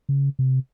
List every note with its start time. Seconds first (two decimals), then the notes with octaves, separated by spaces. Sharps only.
0.09 C#3
0.39 C3